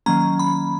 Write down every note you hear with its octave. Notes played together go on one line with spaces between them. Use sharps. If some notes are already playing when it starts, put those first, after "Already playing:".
D#3 F#3 A#3 C#4 A#5
B5